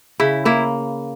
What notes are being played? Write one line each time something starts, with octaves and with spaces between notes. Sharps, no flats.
C#3 E4
A#3 E4